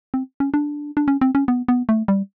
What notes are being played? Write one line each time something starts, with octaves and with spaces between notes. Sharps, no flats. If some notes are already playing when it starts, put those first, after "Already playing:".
C4
C#4
D4
D4
C#4
C4
C#4
B3
B3
A3
G3